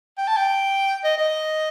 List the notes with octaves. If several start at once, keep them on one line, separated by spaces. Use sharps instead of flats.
G5
A5
G5
D#5
D#5